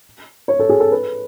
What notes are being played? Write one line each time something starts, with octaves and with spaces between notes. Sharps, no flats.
C#5
A4
G#4
A4
B4